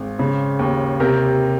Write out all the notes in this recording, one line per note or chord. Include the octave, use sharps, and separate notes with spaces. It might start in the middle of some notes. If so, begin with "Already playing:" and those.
Already playing: G#1
C#3
D#2
C3 G4 A#4